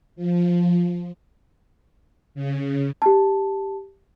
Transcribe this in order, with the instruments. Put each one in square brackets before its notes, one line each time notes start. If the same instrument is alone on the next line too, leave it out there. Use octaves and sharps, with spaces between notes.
[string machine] F3
C#3
[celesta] G4 A5